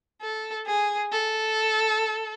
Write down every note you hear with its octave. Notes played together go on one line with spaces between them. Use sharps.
A4
G#4
A4